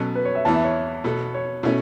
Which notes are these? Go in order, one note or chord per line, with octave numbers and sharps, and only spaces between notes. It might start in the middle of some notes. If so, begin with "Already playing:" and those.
Already playing: B2 F#3 C#4 A4
B4
C#5
E5
E2 E3 B3 A5
E5
C#5
B2 B3 A4
C#5
B2 A3 C#4 E4